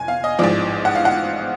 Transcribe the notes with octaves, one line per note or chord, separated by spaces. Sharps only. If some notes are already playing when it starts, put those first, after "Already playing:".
Already playing: F1 G#5
F5
D#5
A1 G#2 F3 D5
F#5
F5
F#5